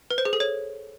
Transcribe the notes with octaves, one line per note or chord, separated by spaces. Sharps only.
B4
C5
G#4
A4
C#5